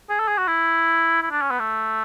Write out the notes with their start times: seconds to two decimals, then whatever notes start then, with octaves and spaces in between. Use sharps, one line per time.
0.10 G#4
0.19 A4
0.28 G#4
0.38 F#4
0.47 E4
1.22 E4
1.31 D4
1.42 C#4
1.51 B3
1.59 A3